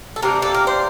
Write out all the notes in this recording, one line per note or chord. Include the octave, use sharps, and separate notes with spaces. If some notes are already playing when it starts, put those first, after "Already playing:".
A4
C3 G3 A#3 D4 A#4
A4
A#4
C5